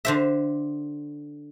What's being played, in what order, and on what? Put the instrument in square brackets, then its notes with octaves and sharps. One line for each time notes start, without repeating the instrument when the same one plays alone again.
[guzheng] D3 C5 E5